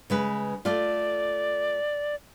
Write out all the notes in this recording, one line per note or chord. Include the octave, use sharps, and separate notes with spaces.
C#3 G#3 B4
A3 F4 D5